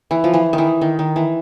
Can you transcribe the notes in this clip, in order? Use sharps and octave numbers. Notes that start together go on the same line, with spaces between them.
E3
F3
E3
D#3
E3
D#3
D#3
E3